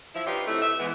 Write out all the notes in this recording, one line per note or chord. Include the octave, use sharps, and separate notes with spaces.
F3 E4 E5
D4 D#4 F4 G4 B4 C#5
C3 A3 E4
E5
E3 G#3 B3